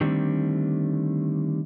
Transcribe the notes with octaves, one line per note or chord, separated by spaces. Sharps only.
D3 D#3 G3 A3 C4 D4